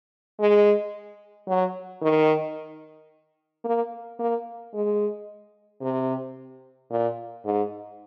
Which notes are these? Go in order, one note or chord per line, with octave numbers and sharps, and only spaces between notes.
G#3
F#3
D#3
A#3
A#3
G#3
C3
A#2
G#2